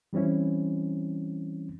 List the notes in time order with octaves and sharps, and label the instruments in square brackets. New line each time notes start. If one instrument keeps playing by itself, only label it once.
[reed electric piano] E3 G3 C4 C#4 E4